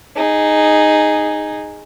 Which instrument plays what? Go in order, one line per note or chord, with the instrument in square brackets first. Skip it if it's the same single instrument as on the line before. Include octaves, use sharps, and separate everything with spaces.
[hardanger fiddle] D#4 G#4